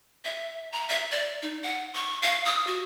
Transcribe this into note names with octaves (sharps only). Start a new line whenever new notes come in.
E5
A#5
E5
D5
D#4
F#5
C#6
F5
D#6
F#4